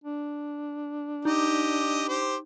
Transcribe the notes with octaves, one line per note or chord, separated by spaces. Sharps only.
D4
D#4 G4 D#5
G4 C5